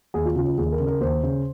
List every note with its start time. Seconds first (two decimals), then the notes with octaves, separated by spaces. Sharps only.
0.14 D#2 G#4
0.25 F4
0.36 C#3 F4
0.47 F4
0.58 D#2 G#4
0.72 A#4
0.80 C#3
0.87 A#4
1.01 D#2 C5
1.23 C#3